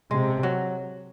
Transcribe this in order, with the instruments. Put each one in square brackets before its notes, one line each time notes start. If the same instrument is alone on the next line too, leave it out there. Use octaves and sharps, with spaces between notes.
[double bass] C3 [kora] G#3
[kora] F#3